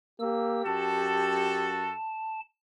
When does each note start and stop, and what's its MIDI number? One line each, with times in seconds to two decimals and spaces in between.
0.19 0.65 58
0.19 1.85 67
0.19 0.61 88
0.66 1.94 42
0.66 1.94 66
0.66 1.94 69
0.66 2.40 81